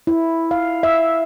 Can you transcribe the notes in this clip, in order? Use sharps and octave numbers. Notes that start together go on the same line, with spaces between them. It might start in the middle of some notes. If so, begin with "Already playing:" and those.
E4
F5
E5